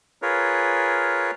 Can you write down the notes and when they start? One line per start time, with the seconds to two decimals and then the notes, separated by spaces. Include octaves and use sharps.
0.22 F4 G#4 A#4 B4 C#5